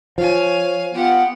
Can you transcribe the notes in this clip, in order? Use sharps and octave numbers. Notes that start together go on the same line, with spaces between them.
F3 C#5 F5 G#5
B3 F4 G4 F#5